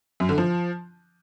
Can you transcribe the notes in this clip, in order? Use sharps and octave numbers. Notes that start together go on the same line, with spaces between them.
F#2
D3
F3